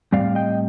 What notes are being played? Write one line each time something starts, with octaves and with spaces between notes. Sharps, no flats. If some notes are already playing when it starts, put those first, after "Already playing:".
A2 G3 C4 D5 F5
D#5 G5